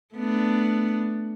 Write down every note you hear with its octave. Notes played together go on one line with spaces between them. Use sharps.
A3 B3 D4